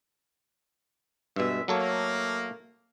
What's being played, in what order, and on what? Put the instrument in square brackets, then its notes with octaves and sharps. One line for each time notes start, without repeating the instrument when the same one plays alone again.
[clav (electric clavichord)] G2 B2 [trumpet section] G#3 E5
[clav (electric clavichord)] F#3 A4 C#5 [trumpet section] A3 A#3